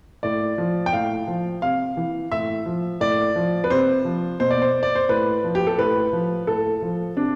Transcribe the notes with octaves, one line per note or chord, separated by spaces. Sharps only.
A2 D5
F3
G5
A2 F5
F3
C3 F5
E3
A2 E5
F3
A2 D5
F3
B4
C3 C5
F3
B2 C5
D5
C5
D5
C5
A2 B4
F3
G4
A4
A2 B4
F3
A2 A4
F3
C3 D4